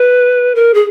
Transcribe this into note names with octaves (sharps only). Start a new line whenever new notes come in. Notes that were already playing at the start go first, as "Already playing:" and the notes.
Already playing: B4
A#4
G#4